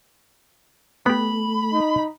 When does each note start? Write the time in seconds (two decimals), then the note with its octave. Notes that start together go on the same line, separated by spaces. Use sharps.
1.06 A3 B3 G4 B5
1.73 D#4